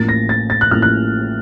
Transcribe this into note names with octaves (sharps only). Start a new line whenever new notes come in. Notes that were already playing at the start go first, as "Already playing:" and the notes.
Already playing: A1 A2 F3 A#3 A6
A#6
A6
A6
F#6
A1 A2 F3 A#3 F6
F#6